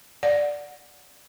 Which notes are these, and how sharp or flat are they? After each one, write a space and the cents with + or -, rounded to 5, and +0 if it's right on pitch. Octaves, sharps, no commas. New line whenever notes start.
D5 +0 F#5 -10